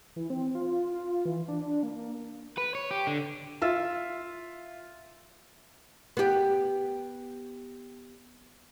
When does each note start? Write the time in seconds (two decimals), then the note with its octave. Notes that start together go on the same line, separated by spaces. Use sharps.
0.16 E3
0.30 C4
0.55 F4
0.94 F4
1.25 E3
1.48 D4
1.83 A#3
2.58 B4
2.75 C#5
2.91 G4
3.07 D3
3.62 F4 E5 E6
6.17 B3 G4